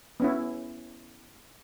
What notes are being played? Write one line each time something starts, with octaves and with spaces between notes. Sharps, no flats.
B3 C#4 E4